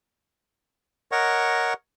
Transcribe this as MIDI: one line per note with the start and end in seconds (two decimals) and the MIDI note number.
1.12 1.74 70
1.12 1.74 73
1.12 1.74 75
1.12 1.74 78
1.12 1.74 85